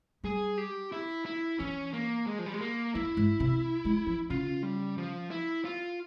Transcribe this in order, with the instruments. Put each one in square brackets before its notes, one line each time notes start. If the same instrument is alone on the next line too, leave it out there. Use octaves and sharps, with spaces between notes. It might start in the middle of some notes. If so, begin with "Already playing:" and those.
[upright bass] G3 [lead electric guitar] G#4
[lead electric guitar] G4
E4
E4
[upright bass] E3 [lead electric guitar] C#4
[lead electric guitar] A#3
G#3
F3
G3
G#3
A#3
[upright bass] F2 [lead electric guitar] E4
[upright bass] G#2
C3
G#3
F3
[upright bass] C#3 [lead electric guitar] F4
[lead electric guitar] G3
F3
E4
F4